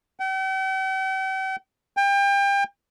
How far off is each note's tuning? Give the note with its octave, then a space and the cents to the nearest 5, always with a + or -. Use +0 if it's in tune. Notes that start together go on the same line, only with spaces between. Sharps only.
G5 -45
G5 +30